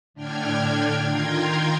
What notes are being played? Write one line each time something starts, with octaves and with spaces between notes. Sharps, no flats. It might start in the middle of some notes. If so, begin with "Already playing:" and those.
A2 D3 D4 G5 F6 G#6
D#3 F4 G5 A#5 C6 G#6